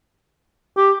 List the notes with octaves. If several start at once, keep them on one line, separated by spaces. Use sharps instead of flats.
G4